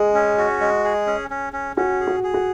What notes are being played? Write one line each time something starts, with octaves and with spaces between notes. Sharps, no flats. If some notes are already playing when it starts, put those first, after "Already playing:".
Already playing: G#3 G#4
C#4
F#4
G#3
G#4
C#4
C#4
C#4
C#4 F#4
G#4
F#4
G#4
F#4